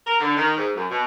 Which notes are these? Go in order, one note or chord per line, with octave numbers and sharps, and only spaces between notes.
A#4
D3
D#3
G#2
F#2
B2